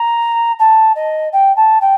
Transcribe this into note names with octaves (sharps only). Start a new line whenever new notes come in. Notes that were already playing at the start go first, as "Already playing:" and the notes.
Already playing: A#5
A5
D#5
G5
A5
G5